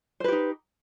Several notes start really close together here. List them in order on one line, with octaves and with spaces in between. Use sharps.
C5 B4 G4 D#4